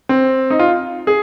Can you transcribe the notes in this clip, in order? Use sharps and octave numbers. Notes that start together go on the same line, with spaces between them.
C4
D#4
F4
G#4